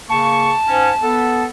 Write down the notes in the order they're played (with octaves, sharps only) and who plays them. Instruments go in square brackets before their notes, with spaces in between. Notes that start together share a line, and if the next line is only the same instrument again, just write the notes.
[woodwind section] C#3 A#3 C#6 [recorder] A5
[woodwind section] G#2 C#4
B3 A4